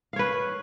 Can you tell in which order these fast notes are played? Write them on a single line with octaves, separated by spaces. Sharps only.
F5 C#5 B4